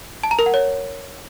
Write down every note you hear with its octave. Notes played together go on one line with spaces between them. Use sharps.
A5
A#5
A#4
F#5
C#5